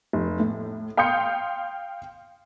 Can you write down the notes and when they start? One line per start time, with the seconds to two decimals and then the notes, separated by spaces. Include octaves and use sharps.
0.13 F1
0.40 A2
0.97 F5 G5 C6 D#6 G6 C#7